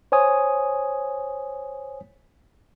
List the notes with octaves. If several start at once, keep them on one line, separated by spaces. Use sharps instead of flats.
C5 C#5 G#5 D#6